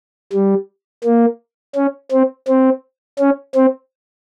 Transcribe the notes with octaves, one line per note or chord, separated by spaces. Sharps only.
G3
A#3
C#4
C4
C4
C#4
C4